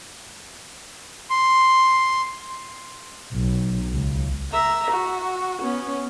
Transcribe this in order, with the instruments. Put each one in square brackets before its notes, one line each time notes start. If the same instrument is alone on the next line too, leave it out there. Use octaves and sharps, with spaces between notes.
[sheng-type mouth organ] C6
[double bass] B1
C#2
[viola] E5 A#5
F#4
B3 C#4